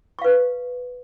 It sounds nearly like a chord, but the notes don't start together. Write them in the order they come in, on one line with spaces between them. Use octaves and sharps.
C#6 F5 B4